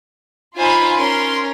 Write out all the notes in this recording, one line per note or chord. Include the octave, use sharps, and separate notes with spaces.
D#4 F4 C5 G#5 B5
C#4 A#4 C6